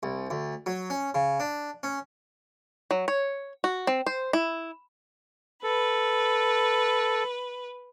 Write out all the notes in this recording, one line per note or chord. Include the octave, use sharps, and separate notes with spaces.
C2
D2
F#3
C#4
C#3
D4
C#4
F#3
C#5
F#4
C4
C5
E4
A4 B4